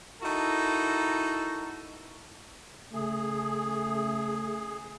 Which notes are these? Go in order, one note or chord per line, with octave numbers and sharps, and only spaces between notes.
D#4 E4 F#4 A4 A#4
C#3 A3 G#4